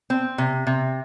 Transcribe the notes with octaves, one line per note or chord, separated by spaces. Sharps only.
C4
C3
C3